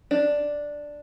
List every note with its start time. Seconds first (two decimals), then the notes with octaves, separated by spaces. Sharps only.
0.11 D4